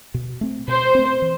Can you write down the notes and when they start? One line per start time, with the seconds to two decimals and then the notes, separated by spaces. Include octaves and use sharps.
0.14 B2
0.41 A3 C4
0.68 B2 C5
0.95 A3 C4
1.22 E3